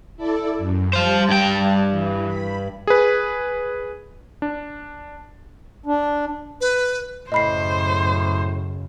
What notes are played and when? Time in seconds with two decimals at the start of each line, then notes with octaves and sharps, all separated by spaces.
0.16 E4 A4 D5
0.58 F#2
0.93 G3 C5 F5 A5
1.29 G2 G5
1.91 E3
2.27 B5
2.87 G#4 B4
4.42 D4
5.86 D4
6.61 B4
7.32 F#2 A2 C#3 C5 D#5 B5 C7